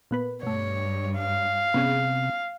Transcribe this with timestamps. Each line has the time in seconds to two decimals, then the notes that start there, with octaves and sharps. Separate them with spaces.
0.11 A#2 B3 B4
0.43 G2 B2 A3 C#5
1.18 F5
1.74 C3 B3 C#4 G#4